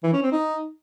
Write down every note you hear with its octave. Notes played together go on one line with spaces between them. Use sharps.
E3
C#4
C4
D#4